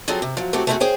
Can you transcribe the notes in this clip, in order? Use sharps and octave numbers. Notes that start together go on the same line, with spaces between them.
F#3 C4 F4 G#4 A4
C3
F3 F#3
F#3 A3 C4 E4 F#4 G4
A3 B3 C4 E4 F#4 G#4
G#4 C5 C#5 G5